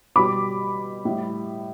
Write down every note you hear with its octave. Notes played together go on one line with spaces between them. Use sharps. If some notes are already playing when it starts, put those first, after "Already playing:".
B2 G3 B5 D6
A2 G3